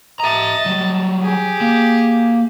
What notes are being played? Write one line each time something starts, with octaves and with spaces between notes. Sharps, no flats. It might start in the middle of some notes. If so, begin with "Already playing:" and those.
D#5 E5 A5 A#5
F#3 G3
G4 G#4
A#3